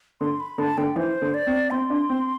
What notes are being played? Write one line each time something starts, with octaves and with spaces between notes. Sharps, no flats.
D3 C6
B5
D3 A5
D3 G5
E3 C5
D3
D5
C4
C4 C6
D4
C4